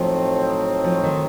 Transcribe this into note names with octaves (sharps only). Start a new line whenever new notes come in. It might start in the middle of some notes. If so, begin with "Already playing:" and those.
Already playing: A2 F3 F#3 A3 C4 D#4
F3
D#3